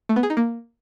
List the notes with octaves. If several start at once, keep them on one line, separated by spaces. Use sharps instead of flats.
A3
B3
G#4
D#4
A#3